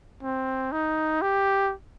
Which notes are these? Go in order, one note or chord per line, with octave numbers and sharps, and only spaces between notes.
C4
D#4
G4